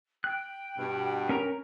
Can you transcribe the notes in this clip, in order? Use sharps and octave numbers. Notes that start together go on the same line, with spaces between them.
G5 F#6
G2 B2
C#4 A#4 A#5